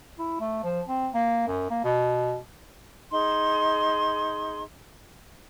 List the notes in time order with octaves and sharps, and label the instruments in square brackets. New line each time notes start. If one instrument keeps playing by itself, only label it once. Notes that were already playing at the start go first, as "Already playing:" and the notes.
[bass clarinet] E4
A3
F3
C4
A#3
F#2
A#3
B2
[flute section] D#4 G#4 C6